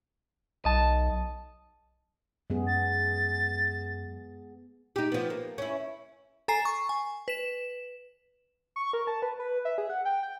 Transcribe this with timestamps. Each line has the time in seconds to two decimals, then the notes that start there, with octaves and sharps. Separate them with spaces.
0.65 B1 D#5 A5
2.50 F#2 G#3 B3 G#4
2.67 A6
4.96 D#4 G4
5.12 F3 B3
5.30 A#3
5.58 C#4 E4
6.48 A4 G#5 A#5 C7
6.65 C#6
6.89 G#5
7.28 B4 E7
8.76 C#6
8.93 A#4
9.07 A5
9.22 B4
9.39 B4
9.65 E5
9.78 G#4
9.90 F#5
10.05 G5
10.23 G5